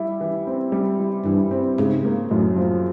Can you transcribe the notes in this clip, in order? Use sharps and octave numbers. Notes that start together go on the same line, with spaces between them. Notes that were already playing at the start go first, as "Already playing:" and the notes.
Already playing: G3 E4
E3
C4
G3
E4
G2 E3
C4
G#2 C#3
A#3
F#2 A2
F3